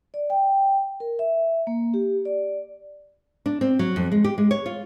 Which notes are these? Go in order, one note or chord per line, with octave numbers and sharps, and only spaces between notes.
D5
G5
A#4
E5
A#3
G4
D5
D4
C4
F#3
F2
G#3
G4
G#3
C#5
F4